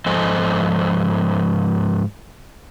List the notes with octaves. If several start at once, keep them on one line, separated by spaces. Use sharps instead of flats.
G#2 F3 A4 C5 D#5 G#5